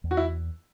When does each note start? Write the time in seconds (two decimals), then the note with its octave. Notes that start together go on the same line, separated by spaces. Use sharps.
0.04 E2
0.11 F#4
0.17 E4